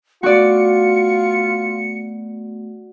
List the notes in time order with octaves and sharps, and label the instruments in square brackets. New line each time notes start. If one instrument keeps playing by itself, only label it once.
[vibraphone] A3 B3 [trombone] F4 [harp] F#4 D5 [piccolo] C#7